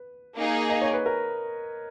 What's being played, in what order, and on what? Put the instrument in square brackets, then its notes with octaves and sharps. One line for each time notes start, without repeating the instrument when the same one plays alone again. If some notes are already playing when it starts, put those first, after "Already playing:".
Already playing: [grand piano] B4
[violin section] A#3 D#4 G#4
[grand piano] D#5
C#5
B4
A#4